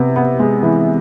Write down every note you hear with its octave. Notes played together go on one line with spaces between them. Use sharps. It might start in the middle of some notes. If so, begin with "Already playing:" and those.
Already playing: C3 B3
B3
G#3
E3